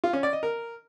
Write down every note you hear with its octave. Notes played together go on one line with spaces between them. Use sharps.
F4
C#4
D5
D#5
A#4